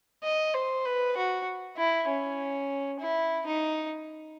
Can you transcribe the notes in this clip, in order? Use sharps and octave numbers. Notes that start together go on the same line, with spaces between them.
D#5
C5
B4
F#4
E4
C#4
E4
D#4